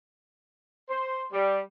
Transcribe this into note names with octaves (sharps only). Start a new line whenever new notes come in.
C5
G3